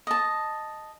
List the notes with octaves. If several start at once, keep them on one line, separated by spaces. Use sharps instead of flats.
D#5 A5